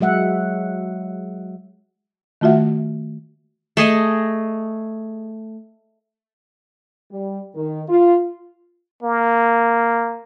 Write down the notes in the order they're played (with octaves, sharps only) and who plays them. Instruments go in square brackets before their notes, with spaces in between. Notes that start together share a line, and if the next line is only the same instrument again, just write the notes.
[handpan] F#3 G#3 E5 F#5
[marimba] D#3 A3 F4 F#4 E5 F#5
[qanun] A3 G#4 D#5
[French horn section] G3
D#3
F4
[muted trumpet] A#3